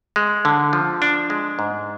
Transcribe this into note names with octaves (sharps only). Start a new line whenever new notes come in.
G#3
D3
F3
D4
G#3
G#2